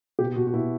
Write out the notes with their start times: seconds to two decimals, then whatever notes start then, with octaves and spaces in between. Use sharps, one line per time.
0.19 B2 G4
0.36 B2 F#4
0.47 F#4
0.53 B2 E4